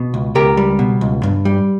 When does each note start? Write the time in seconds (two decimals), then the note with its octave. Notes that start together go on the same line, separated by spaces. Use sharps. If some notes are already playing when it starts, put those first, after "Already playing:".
Already playing: B2
0.14 C#2
0.35 C#2 G4 A#4
0.57 G3
0.79 B2
1.01 C#2
1.23 G2
1.45 G3